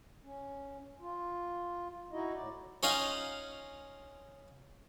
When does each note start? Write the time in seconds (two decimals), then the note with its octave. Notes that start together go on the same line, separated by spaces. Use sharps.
0.24 C#4
1.00 F4
2.12 D#4 E4 F#4 D#5
2.34 A2 D5
2.83 C#4 D#4 F4 F5 F#5 G#5